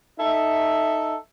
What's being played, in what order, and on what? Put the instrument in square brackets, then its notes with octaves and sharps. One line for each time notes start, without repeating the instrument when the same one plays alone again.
[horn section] D#4 A4 E5